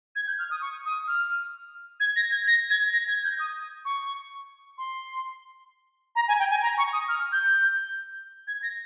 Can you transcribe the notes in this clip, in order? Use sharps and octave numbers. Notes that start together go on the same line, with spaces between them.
G#6
G6
F6
D#6
C#6
D#6
F6
G#6
A#6
G#6
A#6
G#6
A#6
G#6
G6
D#6
C#6
C6
A#5
G#5
G5
G#5
A#5
C#6
D#6
F6
G6
G#6
A#6